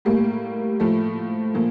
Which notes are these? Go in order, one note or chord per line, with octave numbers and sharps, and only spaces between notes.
A2 G3 A#3
A2 F3 A3
A#2 F3 A#3